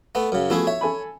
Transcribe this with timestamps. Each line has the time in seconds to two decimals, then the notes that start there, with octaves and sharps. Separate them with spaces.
0.15 A3 B3
0.32 F#2 C#3
0.50 F3 A3 B3 E4 F#4 G#4
0.67 C#5 E5
0.81 A4 G#5 B5